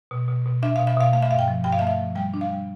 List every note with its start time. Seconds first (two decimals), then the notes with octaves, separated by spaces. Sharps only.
0.11 B2
0.28 B2
0.46 B2
0.63 D4 E5
0.76 B2 F5
0.87 E5
0.97 B2 F5
1.13 A3 F5
1.22 E5
1.31 G2 F5
1.39 G5
1.48 F3
1.64 G2 G5
1.73 F5
1.79 A3 E5
1.87 F5
1.99 F3
2.15 G3 G5
2.34 D4
2.41 F5
2.50 G3